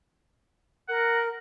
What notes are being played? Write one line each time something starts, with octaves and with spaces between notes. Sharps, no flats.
A#4 F#5